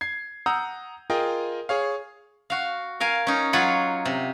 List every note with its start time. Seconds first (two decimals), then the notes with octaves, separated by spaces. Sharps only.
0.01 G#6 C7
0.46 F#5 A#5 D#6 E6 G6
1.10 F4 G#4 A#4 D#5 G5
1.69 G#4 C#5 F5
2.50 F#4 F5
3.00 A#4 F5 G#5
3.27 C#4 D#4
3.53 F#3 F4 C#5 F#5 B5
4.05 C3